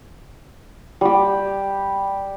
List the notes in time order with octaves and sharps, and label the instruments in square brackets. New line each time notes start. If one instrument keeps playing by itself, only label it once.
[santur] G3 G4